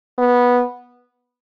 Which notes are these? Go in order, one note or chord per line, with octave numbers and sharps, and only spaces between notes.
B3